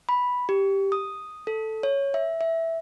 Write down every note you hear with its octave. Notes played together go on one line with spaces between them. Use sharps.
B5
G4
D#6
A4
C#5
E5
E5